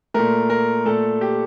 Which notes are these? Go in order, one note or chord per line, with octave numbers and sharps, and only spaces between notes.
A#2 A3 A#4
A#4
A#2 A3 A4
G4